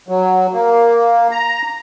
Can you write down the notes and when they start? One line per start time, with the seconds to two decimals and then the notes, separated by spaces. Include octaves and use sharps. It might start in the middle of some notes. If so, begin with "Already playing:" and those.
0.08 F#3
0.54 A#3
1.31 A#5